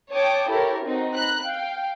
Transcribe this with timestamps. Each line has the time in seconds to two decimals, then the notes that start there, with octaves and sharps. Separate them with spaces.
0.13 C#5 G5 A5 D6 D#6
0.50 E4 G4 A4 A#4 C#5
0.85 C4 D#4 F#4
1.16 A#5 B5 F#6
1.45 F5 G5